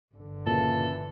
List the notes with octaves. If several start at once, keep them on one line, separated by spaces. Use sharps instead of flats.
G1 D3
A#2 C#3 E3 A4